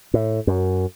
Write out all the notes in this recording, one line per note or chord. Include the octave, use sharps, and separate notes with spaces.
A2
F#2